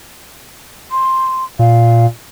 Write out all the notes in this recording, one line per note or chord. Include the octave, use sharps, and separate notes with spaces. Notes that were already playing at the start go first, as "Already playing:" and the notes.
C6
A#2 F5